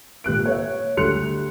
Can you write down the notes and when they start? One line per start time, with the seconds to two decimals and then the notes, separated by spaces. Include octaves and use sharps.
0.24 A#2 G4 F#6 D7
0.46 C#5 E5
0.97 D2 G3 C6 F#6 C#7 F7